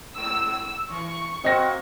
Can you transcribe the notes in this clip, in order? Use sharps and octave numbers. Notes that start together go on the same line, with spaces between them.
G#2 E6
E3 C#6
A#3 C4 F#4 D#5 A#6